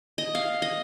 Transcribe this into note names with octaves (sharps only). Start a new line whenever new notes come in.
D#5
F5
D#5